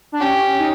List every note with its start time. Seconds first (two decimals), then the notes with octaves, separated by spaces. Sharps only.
0.12 D4
0.20 C#4 G4
0.59 D#4